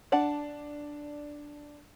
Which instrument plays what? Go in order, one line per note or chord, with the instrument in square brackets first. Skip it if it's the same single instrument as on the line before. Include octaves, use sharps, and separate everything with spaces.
[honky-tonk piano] D4 [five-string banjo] D5 F#5 A5